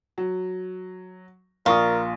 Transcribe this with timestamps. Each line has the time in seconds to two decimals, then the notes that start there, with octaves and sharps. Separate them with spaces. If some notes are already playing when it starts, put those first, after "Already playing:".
0.18 F#3
1.66 A#1 F4 A#4 C#6 D#6